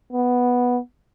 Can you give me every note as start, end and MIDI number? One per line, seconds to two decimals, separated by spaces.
0.13 0.78 59